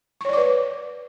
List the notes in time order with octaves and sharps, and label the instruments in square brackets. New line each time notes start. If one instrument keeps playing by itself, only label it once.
[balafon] C#6
C#5
D5
D6
B4